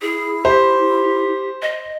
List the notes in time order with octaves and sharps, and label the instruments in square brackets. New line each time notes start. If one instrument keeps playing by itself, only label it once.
[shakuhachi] E4 [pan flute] G#4
[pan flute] G4 [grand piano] C5
[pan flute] D#5